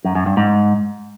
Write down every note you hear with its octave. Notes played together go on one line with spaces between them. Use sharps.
F#2
F#2
G2
G#2